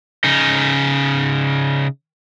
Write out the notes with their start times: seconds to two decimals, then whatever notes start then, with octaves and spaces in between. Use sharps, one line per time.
0.24 C#3 D#4